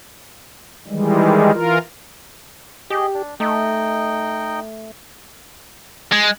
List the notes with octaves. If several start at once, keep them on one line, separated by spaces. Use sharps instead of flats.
D#3 E3 G3 G#3
E3 F4 A#4
G4 G#4 D#5
D4
A3 D#4 D#5 G5
G#3